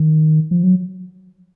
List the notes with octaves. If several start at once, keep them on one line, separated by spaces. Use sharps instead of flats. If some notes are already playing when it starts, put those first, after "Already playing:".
Already playing: D#3
F3
F#3